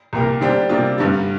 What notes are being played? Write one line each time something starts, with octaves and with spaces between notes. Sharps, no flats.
C2 A#2 A#3 G4 A#4
D3 G3 D4 G4 C5
C3 G3 A#3 D4 F4
G2 D3 G3